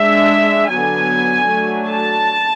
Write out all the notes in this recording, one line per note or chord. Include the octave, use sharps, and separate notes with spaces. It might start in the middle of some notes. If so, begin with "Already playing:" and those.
Already playing: G#3 D4 E5
D3 F#3 B3 D4 G#5
F#3 A3 D4
A5